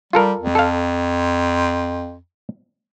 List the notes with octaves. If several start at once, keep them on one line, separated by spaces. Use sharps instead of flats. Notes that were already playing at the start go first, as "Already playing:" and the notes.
G3 F4 A4 A#4
F2
A4 F5